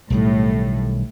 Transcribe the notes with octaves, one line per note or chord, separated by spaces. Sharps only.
B1 A2 D#3 G3